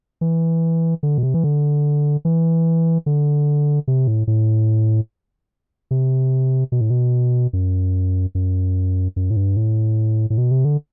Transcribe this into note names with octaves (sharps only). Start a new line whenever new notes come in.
E3
D3
B2
C3
E3
D3
E3
D3
C3
A2
A2
C3
B2
A2
B2
F#2
F#2
F#2
A2
G2
A2
A2
B2
C3
D3